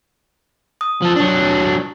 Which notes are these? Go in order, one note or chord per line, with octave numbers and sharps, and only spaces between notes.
D#6
F3 A4
F#3 D4